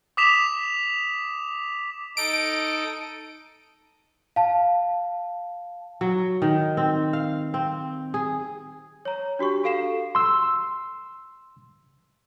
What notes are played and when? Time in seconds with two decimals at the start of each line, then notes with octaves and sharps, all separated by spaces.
0.17 D6 D#6 B6 E7 F7
2.17 D#4 A4 D#5 D7
4.36 F5 A5
6.01 F#3
6.42 D#3
6.77 C4
7.13 F5
7.54 C4
8.14 G#4
9.05 C#5 A#5
9.39 D4 F#4 G4 C#6
9.63 F#4 A4 F5 C7 E7
10.15 C6 E6